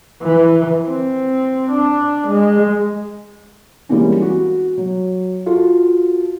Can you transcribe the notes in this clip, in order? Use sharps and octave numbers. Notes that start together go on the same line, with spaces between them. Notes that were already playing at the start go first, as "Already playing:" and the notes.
E3
C4
D4
G#3
E3 G3 G#3 A#3 C4 C#4
F#4
F#3
F4 F#4 A4